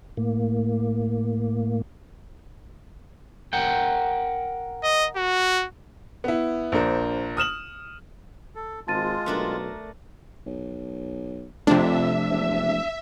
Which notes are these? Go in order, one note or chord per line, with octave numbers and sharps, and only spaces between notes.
A2 A#3
A#4 F#5 G5
D#5
F#4
B3 E4
A#1 D4 A#4 C5
D#6 F6 E7 F#7
A4
G#1 G#3 F4 A5 A6 D#7
B1 A3 D4 A#4
B1
F2 C3 F3 A3 D4 E5
E1